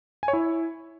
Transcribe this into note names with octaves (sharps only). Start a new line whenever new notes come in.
G#5
C#5
E4